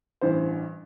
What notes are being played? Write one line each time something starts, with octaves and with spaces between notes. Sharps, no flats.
A1 G2 E3 C5